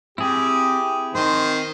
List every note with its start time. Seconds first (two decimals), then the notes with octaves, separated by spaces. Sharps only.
0.18 C4 E4 G4 G#4
1.15 D#3 C4 C5